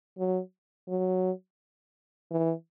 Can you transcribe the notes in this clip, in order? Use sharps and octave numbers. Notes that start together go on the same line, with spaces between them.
F#3
F#3
E3